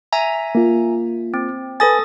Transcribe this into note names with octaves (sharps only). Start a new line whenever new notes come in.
E5 G#5 A#5
A#3 F4
C4
A4 B4 G#5 D#6 A6